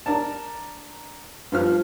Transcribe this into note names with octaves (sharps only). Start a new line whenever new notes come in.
D4 A#4 A5
G2 F3 F6